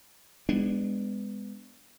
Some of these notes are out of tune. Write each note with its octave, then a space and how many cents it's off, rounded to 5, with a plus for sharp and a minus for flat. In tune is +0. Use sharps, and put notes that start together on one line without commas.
G#3 -25 B3 +15 D4 +0